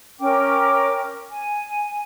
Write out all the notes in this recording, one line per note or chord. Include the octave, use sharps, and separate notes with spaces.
C#4 A#4 G5 D6
G#5